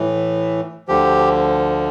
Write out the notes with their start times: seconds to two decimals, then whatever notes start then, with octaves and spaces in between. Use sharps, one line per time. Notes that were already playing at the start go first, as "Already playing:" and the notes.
Already playing: A2 E3
0.88 D2 D3 F3 G4